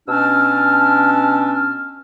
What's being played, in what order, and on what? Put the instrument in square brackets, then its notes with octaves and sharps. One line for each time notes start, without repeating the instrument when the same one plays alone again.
[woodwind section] B2 C#4 D4 E6 F6